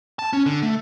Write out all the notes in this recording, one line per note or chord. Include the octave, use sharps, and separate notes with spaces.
A5
C#4
D3
A3